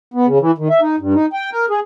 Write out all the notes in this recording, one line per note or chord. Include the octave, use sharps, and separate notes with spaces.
B3
C#3
E3
D#3
E5
D#4
G2
D#4
G5
A#4
G#4